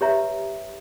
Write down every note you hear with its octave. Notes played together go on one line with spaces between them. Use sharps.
G4 B4 C#5 E5 A#5